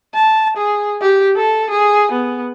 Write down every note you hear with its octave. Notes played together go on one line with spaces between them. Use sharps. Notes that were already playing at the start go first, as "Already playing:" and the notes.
A5
G#4
G4
A4
G#4
B3